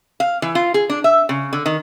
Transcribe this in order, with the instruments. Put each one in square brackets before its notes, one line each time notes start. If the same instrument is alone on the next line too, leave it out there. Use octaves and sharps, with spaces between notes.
[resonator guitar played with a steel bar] F5
E3
F4
G#4
D4
E5
C#3
D3
D#3